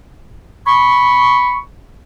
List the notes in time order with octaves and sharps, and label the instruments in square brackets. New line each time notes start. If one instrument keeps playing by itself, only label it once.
[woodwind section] B5 C#6